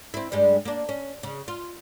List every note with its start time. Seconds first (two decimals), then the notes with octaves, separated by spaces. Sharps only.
0.14 C4 E4
0.32 G2 G3 G#3
0.65 A#3 D4
0.89 C#4
1.23 C#3
1.48 F4